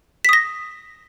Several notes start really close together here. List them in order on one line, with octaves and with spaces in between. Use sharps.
B6 D#6 A#6